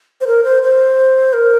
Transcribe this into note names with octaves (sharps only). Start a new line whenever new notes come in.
C5
A#4
C5
C5
A#4